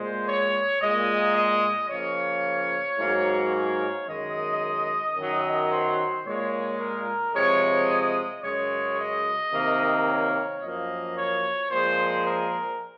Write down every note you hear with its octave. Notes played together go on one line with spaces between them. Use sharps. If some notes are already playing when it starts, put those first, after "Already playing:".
Already playing: A#2 G#3 C5
C#5
A#2 G#3 D#5
D#5
C#3 F3 A#3 C#5
G#2 F#3 A#3
C#5
F#2 D#3 G#3 D#5
F#2 D#3 F#3
C5
A#2 G#3 C#5
A#4
C3 F3 G#3 C#5
D#5
F#2 C#3 G#3 C#5
D#5
C3 D#3 A#3
C#5
F#2 F3 A#3 D#5
C#5
A#2 F3 G#3 C5
A#4